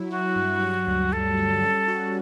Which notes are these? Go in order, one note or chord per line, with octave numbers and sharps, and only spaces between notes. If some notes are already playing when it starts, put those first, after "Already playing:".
Already playing: F#3 E4
F#3 F#4
G2
G3
D2
D2 A4
G3
C#4
F#4